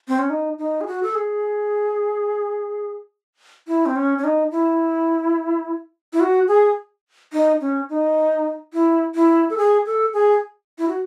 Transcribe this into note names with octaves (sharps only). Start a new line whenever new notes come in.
C4
C#4
D#4
D#4
G#4
F#4
A4
G#4
E4
C4
C#4
C#4
D#4
E4
E4
F#4
G#4
D#4
C#4
D#4
E4
E4
A4
G#4
A4
G#4
E4
F#4